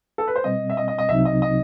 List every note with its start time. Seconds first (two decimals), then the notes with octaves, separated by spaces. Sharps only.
0.18 A4
0.27 B4
0.36 C5
0.44 B2 G3 C4 D#5
0.70 E5
0.77 D#5
0.88 D#5
0.98 D#5
1.09 C2 C3 F#3 C4 D#4 E5
1.25 D#5
1.42 D#5